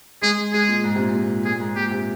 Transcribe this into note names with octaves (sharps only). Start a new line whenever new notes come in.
G#3 G#4
G#3 G#4
A#2
G#2
C3
A#2
A#2
A#2 G#4
G#2
A#2 G4
C3